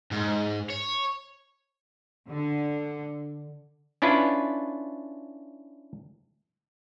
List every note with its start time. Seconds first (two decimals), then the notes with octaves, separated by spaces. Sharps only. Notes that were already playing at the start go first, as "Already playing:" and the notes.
0.11 G#2
0.70 C#5
2.28 D3
4.02 C#4 D4 E4 F4 B4